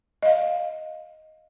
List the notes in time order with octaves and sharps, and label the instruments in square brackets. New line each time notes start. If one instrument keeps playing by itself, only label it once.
[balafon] D#5 F5